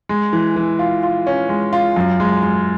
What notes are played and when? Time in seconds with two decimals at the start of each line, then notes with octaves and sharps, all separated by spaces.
0.09 G#3
0.33 E3
0.56 E3
0.79 F4
1.03 F4
1.27 C#4
1.49 G#3
1.73 F4
1.96 F#2
2.20 G#3
2.43 G#3